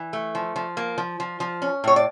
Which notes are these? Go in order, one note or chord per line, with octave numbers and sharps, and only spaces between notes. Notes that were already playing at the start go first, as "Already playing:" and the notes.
Already playing: E3
A3
F3
F3
A#3
F3
F3
F3
C#4
A2 C#5
D5